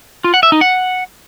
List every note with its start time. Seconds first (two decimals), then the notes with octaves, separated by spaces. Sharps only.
0.24 F4
0.34 F#5
0.43 E5
0.52 D#4
0.61 F#5